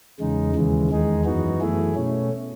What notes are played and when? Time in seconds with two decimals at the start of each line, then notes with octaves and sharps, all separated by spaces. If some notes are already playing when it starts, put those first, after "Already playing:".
0.20 E2 C#3 G#3 D#4
0.55 D#2 C#3 E3 G#3
0.90 E2 D#3 G#3 D#4 G#4
1.24 F#2 E3 B3 D#4 F#4
1.60 F#2 E3 A3 E4 G#4
1.95 B2 A3 C#4